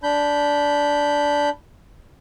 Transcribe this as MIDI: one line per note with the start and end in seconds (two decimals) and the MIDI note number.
0.03 1.49 62
0.03 1.49 83
0.03 1.49 91